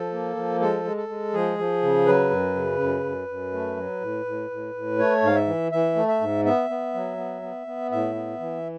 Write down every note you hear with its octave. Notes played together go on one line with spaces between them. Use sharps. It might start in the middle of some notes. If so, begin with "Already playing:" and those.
Already playing: F3 A4
A#3
F3
G#3 A4
G#3
A4
G#3
F3 G#4
F3
C#3
F#3 B4
F#2
C#3
F#2
F#2
F#2
A3
F#3
A2
A2
A2
A2
A3 C#5
G#2 F5
E5
E3
E3 E5
A3
E5
G#2
B3 E5
B3
F#3
B3
B3
B3
A2 E5
B3
E3